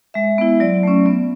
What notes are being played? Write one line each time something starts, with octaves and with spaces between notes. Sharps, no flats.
G#3 E5
B3 E4
F#3 D5
A3 C#4
B3